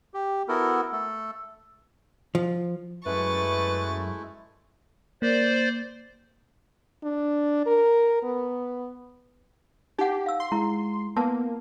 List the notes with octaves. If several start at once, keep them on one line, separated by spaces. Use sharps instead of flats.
G4
B3 E4 F#4 A4 A#4
A3 A4
F3
F#2 G#3 A3 E4 B4 C#6 A6
A#3 C5 D5
D4
A#4
B3
D#4 G4 F#5
F5 E6
C6
G#3 E4 A#5
A#3 B3 A5